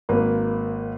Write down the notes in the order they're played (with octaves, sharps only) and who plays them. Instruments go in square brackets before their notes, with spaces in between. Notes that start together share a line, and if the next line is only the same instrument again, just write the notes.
[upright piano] G#1 A#3 B4